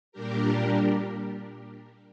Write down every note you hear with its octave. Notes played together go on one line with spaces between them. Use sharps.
A#2 G3 D4 G4 A#4